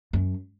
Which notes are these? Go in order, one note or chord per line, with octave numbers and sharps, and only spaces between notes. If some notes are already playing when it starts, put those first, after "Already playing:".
F#2